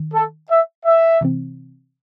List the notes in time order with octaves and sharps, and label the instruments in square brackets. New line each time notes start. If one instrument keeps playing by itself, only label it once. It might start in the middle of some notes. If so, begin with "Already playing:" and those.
Already playing: [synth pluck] D#3
[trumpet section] A4
E5
E5
[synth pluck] C3 E3 C4